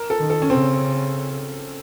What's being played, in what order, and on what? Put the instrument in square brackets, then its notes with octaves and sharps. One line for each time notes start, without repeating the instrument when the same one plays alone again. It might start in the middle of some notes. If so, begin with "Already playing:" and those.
Already playing: [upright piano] A#4
A4
[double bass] D#3
[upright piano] A4
C#4
[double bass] C#3 [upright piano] C4